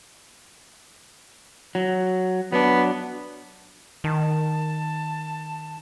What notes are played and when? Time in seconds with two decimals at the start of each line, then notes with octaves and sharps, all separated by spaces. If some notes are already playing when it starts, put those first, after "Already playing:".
1.75 F#3
2.52 F#3 B3 D4
4.04 D#3 A5